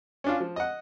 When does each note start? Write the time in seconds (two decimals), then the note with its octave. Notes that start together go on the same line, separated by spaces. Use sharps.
0.24 C#4 D4 F4
0.40 F3
0.56 D#5 F#5